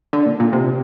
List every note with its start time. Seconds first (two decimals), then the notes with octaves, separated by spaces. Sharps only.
0.13 D3
0.26 A#2
0.40 A#2
0.53 C3